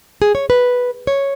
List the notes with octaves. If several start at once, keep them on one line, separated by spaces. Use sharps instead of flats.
G#4
C#5
B4
C#5